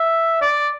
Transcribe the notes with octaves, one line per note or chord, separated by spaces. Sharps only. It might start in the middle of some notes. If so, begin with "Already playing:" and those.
Already playing: E5
D5